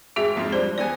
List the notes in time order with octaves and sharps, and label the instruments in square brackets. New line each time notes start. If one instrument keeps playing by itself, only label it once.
[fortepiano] G#1 [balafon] F#4 G#4 E5
[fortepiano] F2 G#2 F3
[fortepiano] G3 D4 [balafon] C5
[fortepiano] E3 B3 G#5 [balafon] D5